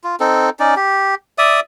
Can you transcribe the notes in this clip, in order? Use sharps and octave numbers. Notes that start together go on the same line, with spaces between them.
F4
C4 D#4 A4
C#4 D#4 D5
G4
D5 E5 D#6